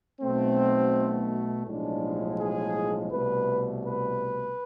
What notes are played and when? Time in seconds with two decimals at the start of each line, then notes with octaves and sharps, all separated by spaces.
0.21 B1 B2 A3 C4
1.67 B1 A2 F3 G#3 D4
2.39 G#4
3.11 C2 B2 A3 B4
3.84 B4